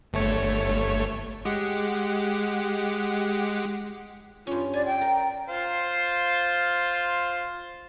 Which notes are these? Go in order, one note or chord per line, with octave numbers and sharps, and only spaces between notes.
G1 A3 C#5
G#3 G4 F#5
G2 C#4 F4
D5 G#5
G5
A#4
F4 C5 F5